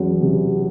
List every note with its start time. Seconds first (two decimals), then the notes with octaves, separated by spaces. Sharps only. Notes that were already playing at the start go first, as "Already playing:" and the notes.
Already playing: E2 F#3 C#4
0.22 C3